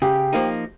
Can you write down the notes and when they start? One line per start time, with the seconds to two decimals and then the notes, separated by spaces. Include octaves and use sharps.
0.02 C#3 G4
0.33 F3 A#3 D#4